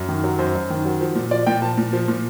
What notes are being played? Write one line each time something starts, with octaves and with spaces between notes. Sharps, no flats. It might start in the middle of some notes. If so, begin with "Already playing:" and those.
Already playing: F#2
D#3
F#3
F#2 C5
F#2
D#3
F#3
F3
A#2
F3 D5
A#2 G5
F3 A5
A#2
F3
A#2